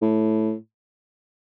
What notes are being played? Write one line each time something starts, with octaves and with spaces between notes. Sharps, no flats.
A2